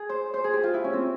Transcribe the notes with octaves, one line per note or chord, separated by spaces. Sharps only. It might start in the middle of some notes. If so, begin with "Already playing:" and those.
Already playing: G#4
C5
C5
G#4
G4
F4
E4
C#4
C4